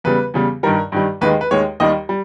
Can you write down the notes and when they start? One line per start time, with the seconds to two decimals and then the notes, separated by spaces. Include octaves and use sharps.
0.04 E2 C#3 G3 B4
0.34 E2 C#3 G3
0.63 G2 D#3 G3 A#4
0.92 G2 D#3 G3
1.21 D#2 D#3 G#3 B4
1.41 B4
1.51 D#2 D#3 G#3 C#5
1.80 D#2 D#3 G3 D#5
2.09 G3